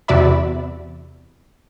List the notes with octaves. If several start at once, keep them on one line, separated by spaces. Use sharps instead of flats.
E2 C3 F#4 D5 E5 B5